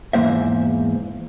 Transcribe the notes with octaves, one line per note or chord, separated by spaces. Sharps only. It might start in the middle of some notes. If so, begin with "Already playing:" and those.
E2 G#2 D#3 A#3 C5 E5